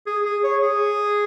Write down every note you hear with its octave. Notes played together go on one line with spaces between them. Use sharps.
G#4
G#4
C#5
G#4